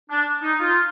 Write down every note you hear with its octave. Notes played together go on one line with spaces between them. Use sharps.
D4
D#4
F4